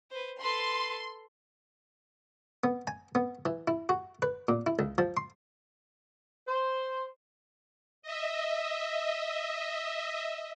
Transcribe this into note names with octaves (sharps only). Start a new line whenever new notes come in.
B4 C5
A4 B4 C6
B3
G#5
B3
E3
E4
F#4
B4
A#2
E4
C#2
F3
C6
C5
D#5 E5